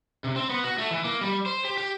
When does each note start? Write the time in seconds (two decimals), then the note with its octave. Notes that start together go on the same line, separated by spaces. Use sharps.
0.24 C3
0.36 C4
0.50 B3
0.64 F#4
0.78 A3
0.91 E3
1.04 A#3
1.21 G3
1.46 C5
1.65 G4
1.78 G4